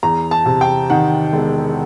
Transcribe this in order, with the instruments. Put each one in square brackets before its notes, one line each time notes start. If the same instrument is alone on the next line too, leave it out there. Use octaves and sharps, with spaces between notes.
[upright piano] E2 A#5
A5
C3
G5
D#3 F#5
E1